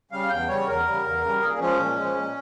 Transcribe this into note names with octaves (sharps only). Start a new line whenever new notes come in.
C#3 G3 F5
E2 G5
C#3 G3 C#5
E2 A#4
C#3 G3
E2
C#3 G3
A#2 G#4
F3 G#3 C#4
A#2
G#3
F3
A#2